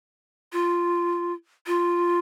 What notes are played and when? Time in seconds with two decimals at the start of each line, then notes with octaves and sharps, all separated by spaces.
0.53 F4
1.67 F4